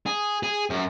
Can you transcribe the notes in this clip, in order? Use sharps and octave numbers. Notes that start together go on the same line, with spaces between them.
G#4
G#4
F#2